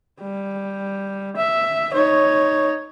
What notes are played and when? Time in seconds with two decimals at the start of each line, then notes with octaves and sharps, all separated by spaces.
0.21 G3
1.37 E5
1.94 D#4 C#5